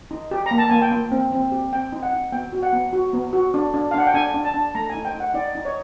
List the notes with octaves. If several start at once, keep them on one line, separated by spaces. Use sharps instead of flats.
D#4
G4
A#5
A#3
A5
A#3 G#5
G5
A#3
C4
C4
G4
C4 G5
D#4
F#5
D#4
B3 G5
F#4
F#5
B3
F#4
B3
F#4
D4
D4
F5
D4 F#5
G5
D4 G#5
D4
A5
D4
A3 A#5
G#5
D#4
G5
D#4
F#5
D#4 D5
D#4
C#5